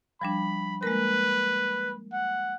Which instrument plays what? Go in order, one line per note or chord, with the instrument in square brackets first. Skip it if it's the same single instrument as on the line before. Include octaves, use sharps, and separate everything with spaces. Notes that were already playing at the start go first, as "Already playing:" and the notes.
[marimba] F3 G3 D4 [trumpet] B5
[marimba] G#3 A#3 A#4 [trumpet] B4
[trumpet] F#5